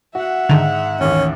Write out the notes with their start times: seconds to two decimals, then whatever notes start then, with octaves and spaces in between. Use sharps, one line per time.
0.15 F#4 E5 F#5
0.49 G#2 D3 D#3 F7
1.01 A1 D#2 C#4